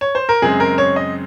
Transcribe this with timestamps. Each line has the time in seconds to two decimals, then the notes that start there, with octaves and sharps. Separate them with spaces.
0.01 C#5
0.15 C5
0.29 A#4
0.42 F#2 C#3 G#3 C4 G#4
0.60 A#4
0.78 C#5
0.96 D#5